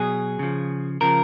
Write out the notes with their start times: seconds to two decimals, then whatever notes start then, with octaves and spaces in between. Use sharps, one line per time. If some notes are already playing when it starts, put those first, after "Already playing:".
Already playing: B2 F#3 G#4
0.39 C#3 F3
1.01 C#3 F3 A#4